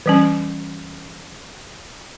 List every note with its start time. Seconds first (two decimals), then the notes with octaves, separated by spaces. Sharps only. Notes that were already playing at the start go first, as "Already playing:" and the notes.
0.06 E3 G3 C#4